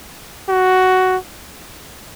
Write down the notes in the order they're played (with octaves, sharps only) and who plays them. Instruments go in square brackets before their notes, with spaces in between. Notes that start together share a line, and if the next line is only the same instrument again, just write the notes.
[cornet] F#4